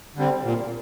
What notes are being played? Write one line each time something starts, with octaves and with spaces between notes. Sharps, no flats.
D3 G3 C4
A#2